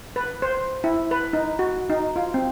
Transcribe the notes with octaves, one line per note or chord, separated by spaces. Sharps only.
B4
C5
E4
B4
D#4
F#4
D#4
F4
C4